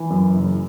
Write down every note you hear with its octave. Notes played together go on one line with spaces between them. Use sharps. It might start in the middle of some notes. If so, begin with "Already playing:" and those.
Already playing: E3
F#2
F#1